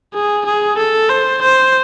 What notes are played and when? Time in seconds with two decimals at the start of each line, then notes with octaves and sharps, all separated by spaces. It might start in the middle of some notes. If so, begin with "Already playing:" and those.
0.14 G#4
0.46 G#4
0.77 A4
1.09 C5
1.42 C5